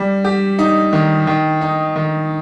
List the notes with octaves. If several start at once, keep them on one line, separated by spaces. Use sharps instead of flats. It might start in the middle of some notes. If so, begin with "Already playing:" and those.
Already playing: G3
G4
D#4
D#3
D#3
D#4
D#3